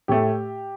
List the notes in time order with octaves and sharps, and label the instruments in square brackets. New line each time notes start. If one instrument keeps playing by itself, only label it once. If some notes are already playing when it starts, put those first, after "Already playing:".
[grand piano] A2 A3 G4